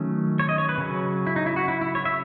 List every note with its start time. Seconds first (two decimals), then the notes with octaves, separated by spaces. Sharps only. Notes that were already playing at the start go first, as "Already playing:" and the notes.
Already playing: D#3 F#3 A3 C#4
0.39 C#5
0.49 D#5
0.58 C#5
0.69 B4
0.78 C#3 F#3 C#4
1.27 E4
1.36 D#4
1.46 E4
1.56 F#4
1.68 E4
1.81 E4
1.95 C#5
2.05 E5